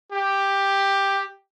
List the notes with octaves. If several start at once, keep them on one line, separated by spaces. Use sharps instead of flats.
G4